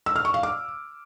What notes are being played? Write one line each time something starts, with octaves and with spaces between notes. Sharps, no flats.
E6
F6
C#6
F5
D6